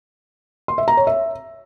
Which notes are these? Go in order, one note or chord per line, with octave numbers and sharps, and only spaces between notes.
C6
E5
A#5
C#5
E5